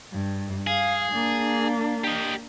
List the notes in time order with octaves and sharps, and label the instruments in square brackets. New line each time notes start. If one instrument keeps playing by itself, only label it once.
[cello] G2
[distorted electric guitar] G#4 [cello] F5
[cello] A#3 D4
[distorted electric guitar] G4 D#5